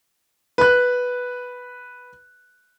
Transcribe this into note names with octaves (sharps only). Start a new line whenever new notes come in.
B4 F#6